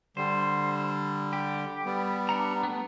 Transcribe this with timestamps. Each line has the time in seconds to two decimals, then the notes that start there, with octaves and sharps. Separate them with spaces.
0.17 D3 G3 C5
1.33 G4
1.86 G3 B3
2.29 D4 F#5 A#5
2.63 A3 B3